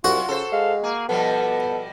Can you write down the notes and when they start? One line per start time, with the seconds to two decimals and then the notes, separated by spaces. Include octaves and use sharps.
0.04 C2 F#2 F4 F#4
0.28 C#3 A4 C5
0.52 G#3 F5
0.83 A#3 G#4
1.09 B2 F3 G3 B3 A4